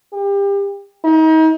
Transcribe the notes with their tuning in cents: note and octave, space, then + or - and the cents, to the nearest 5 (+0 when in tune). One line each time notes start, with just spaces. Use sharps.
G4 +30
D#4 +35